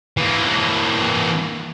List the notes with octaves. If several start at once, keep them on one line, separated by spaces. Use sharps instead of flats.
E3 A#3